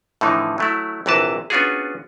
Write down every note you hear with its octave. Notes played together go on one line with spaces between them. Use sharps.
A2 D3 E3 F3 D#4
F#3 A3 E4
A#1 C3 E3 A#4 B4 A5
B3 C#4 D4 F4 F#4 G#4